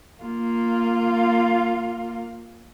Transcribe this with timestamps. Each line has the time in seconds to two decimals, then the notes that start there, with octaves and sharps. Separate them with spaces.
0.22 A#3 F4